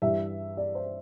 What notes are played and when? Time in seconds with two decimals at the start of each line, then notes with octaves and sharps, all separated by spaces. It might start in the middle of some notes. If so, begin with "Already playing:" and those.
0.02 G2 E3 G3 E5
0.57 D5
0.75 C5